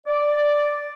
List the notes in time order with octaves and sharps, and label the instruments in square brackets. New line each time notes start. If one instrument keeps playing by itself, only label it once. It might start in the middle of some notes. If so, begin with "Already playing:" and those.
[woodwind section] D5